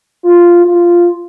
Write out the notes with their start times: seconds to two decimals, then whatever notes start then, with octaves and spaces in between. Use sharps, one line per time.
0.25 F4
0.65 F4